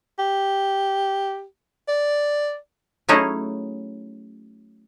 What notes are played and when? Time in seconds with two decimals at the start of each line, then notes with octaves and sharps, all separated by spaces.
0.19 G4
1.88 D5
3.09 F#3 A3 C#4 D#4 E4 G#4